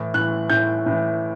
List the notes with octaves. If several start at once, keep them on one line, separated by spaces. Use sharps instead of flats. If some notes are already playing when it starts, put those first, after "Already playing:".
Already playing: A2 E3
A2 E3 F#6
A2 E3 G6
A2 E3